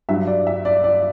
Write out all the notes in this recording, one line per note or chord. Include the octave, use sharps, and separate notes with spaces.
G2 F#3 E5
D5
E5
D5
D5